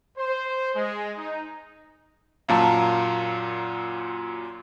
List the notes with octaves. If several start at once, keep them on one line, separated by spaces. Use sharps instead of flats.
C5
G#3
D#4
F#2 A#2 F#3 F4 A5 A#5